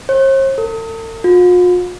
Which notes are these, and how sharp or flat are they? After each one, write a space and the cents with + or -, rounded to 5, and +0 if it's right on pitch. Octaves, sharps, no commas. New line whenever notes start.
C5 +45
A4 +45
F4 +45